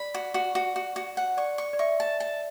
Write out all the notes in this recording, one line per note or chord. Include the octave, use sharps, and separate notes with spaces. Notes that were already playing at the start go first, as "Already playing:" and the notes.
Already playing: D5 B5
F#4
F#4
F#4
F#4
F#4
F#5
D5 C#6
C#6
D5
E5 C#6
A5
A5